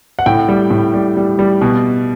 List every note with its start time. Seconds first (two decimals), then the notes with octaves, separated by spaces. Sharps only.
0.19 F#5
0.26 A2 G5
0.48 G3
0.70 A2
0.94 G3
1.17 G3
1.39 G3
1.61 B2